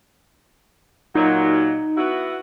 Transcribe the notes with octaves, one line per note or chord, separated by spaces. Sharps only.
A#2 F#3 D#4
B3 E4 F#4